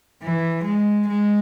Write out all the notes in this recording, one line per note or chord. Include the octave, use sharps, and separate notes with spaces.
E3
G#3
G#3